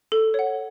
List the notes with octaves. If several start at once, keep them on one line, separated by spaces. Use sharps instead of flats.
A4
C#5 F#5